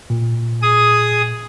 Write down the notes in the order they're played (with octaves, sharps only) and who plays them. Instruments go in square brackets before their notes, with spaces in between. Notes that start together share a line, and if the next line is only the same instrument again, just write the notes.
[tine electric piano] A#2
[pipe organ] G#4 D#6